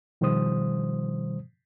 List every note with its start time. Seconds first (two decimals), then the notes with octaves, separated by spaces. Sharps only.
0.21 B2 D#3 F3 G3 C5 D#6